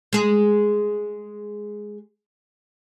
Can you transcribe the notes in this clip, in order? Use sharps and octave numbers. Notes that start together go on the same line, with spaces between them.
G#3 G#4